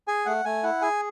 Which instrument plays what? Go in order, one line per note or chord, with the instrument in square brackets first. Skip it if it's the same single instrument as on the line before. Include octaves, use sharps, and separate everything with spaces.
[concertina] G#4 G#5
A3 F#5
A3 G#5
E4 F#5
G#4 G#5